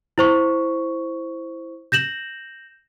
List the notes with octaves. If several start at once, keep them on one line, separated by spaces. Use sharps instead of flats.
E4 C5 C#6
G6 A#6 E7 F#7